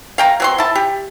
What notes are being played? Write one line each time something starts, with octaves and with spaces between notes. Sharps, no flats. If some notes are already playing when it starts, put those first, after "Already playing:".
F5 G5 A#5
F#3 C4 C6
E4 A5
G4